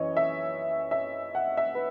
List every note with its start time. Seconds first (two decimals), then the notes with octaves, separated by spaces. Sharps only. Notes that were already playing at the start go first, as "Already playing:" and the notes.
Already playing: F#2 E3 C#5 D#5
0.17 E5
0.91 E5
1.35 F#5
1.57 E5
1.75 B4